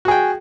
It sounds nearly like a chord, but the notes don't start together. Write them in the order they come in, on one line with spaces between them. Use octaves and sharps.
F#4 G#4 G5